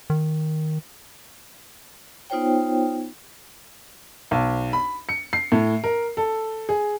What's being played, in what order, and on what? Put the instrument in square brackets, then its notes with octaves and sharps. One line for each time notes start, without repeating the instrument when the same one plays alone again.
[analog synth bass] D#3
[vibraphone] B3 D#4 F4 C5 C#5 G5
[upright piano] B1
B5
C#7
C7
A2
A#4
A4
G#4